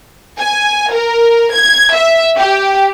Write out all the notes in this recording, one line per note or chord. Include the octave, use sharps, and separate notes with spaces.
G#5
A#4
G#6
E5
G4